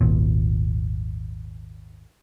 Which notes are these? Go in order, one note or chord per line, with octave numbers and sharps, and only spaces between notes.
G#1 D#2 A#2